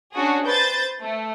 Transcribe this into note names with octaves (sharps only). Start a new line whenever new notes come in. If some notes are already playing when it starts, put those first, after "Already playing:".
C#4 D4 F#4 G#4
B4 C5 G6 A6
A3